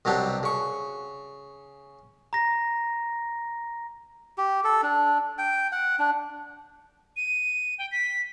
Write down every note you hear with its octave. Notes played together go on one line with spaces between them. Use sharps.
C2 B2 F#3 D4 G4
C#3 C#6
A#5 A#6
G4
A4
D4
G5
F#5
D4
D#7
G5
B6